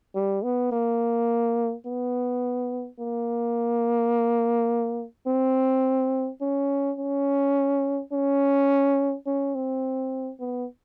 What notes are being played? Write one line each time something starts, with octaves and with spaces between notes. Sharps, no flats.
G3
B3
A#3
B3
A#3
C4
C#4
C#4
C#4
C#4
C4
B3